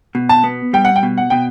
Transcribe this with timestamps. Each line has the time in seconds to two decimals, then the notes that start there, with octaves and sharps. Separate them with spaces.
0.15 B2
0.29 A5
0.44 B3
0.73 G3 G5
0.85 F#5
0.96 G5
1.03 B2
1.18 F#5
1.30 B2 G5